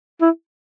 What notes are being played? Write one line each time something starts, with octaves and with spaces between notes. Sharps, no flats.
E4